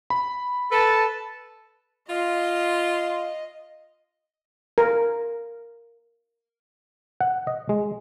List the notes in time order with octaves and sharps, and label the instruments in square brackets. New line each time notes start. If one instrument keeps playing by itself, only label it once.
[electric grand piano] B5
[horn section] A4 B4 A5
[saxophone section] F4 [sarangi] D#5
[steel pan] A#4
[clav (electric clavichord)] F#5
D#5
G#3